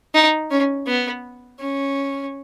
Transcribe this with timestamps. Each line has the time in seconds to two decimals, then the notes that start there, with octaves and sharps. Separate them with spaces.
0.14 D#4
0.50 C#4
0.87 B3
1.60 C#4